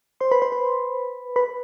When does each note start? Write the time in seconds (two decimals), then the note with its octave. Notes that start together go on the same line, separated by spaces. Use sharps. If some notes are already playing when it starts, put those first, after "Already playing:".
0.20 C5 C6
0.31 B4 B5
0.42 C5 C6
0.52 B4 B5
1.36 B4 B5